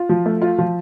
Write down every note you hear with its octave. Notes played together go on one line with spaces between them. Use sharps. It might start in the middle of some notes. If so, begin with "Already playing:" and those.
Already playing: F4
F3
A3
F4
F3